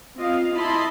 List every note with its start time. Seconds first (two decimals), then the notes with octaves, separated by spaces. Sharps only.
0.17 C4 F4 D#5 F5
0.53 E4 D#5 A5 B5 C6